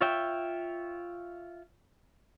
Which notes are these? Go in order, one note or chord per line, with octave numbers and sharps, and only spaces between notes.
F4 C#5 E5 G5